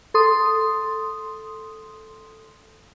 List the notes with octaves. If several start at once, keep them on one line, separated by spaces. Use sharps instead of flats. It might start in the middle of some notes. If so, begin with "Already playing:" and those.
A4 C6 D#6